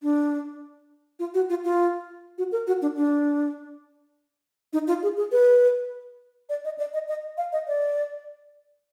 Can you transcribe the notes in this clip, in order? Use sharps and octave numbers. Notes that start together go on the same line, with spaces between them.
D4
F4
F#4
F4
F4
F#4
A#4
F#4
D4
D4
D#4
F4
G#4
G#4
B4
D5
D#5
D5
D#5
D#5
F5
D#5
D5